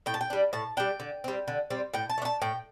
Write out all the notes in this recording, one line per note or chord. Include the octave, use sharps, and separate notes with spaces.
A2 G5
A5
G5
G3 D4
A2 A5
G3 D4 G5
D3
G3 C4
D3
G3 C4
A2 G5
A5
A3 D4
A5
A2 G5